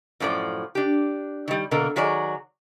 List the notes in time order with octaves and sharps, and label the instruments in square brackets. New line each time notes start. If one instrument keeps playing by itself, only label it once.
[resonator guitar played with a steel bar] F#2 A2 F3 D4 D5
D4 G4
D#3 G3
B2 D3 A#3 A#4
D#3 F#3 G#4 C#5 D5